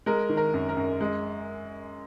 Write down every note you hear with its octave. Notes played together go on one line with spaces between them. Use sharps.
G#3 A#4
D#3
A#4
F#2
A#4
F#2
G#3